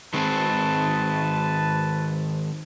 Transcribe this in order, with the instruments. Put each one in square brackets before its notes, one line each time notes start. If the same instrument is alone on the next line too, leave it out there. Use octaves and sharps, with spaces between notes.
[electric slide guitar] D#3 G#3 C4 [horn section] B4 A5